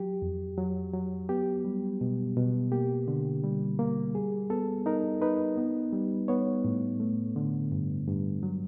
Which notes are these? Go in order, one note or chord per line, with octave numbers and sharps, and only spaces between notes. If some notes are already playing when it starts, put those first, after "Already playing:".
Already playing: F#3 G4
F2
F#3
F#3
B3 G4
G3
B2
B2
A#3 G4
D3
G3
A#3
G3 G#4
B3 A4
D#4 A#4
D#4 B4
B3
G3
B3 C#5
A2
A3
D3
G2
G2
F#3